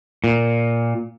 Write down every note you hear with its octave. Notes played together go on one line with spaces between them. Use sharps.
A#2